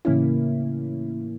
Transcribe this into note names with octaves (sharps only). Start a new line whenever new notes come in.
A2 C#3 E3 A#3 C#4 E4